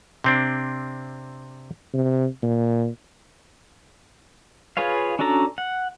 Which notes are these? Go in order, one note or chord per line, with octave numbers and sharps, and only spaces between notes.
C3 C4 D4
C3
A#2
F4 G#4 B4 C#5 F5
C#4 D4 F#4 A4 A#5
F#5